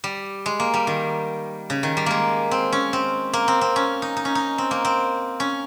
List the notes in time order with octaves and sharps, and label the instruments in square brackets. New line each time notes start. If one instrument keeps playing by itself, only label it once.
[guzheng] G3
G#3
A#3
G3
D#3
C#3
D#3
G3
G#3 A#3
C4
C#4
C4
A#3
C4
C4
C#4
D#4
D#4
C#4
D#4
C4
A#3
C4
C#4